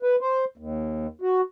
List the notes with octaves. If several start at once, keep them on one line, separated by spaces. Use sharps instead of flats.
B4
C5
D#2
F#4